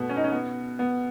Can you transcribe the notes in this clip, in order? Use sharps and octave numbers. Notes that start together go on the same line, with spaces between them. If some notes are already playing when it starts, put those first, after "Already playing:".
Already playing: B2 A3 B3
C#4
D#4
C#4
B3
B3